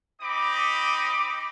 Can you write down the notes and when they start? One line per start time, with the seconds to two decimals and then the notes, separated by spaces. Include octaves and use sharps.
0.21 C4 D#4 B5 D6